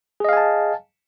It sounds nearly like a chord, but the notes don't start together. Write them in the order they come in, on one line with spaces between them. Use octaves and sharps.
G#4 D#5 F5 G#5 A5